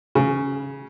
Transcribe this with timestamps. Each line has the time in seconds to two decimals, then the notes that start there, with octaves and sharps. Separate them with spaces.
0.15 C#3